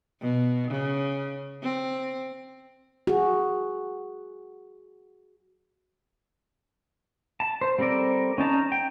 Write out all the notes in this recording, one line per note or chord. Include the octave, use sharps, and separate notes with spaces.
B2
C#3
C4
F#4 G#4
A5
C5
G3 C4 A4 A#4 D5
C#4 D#4 A5 A#5
G5